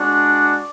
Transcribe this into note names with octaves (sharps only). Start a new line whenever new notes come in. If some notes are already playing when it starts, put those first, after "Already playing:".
Already playing: G#3 D4 F#4
D5